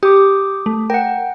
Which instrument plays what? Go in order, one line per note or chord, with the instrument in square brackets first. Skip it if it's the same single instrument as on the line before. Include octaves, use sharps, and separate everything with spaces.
[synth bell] G4 [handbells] D6 D#6
[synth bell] A3
[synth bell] A#4 [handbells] F#5 G5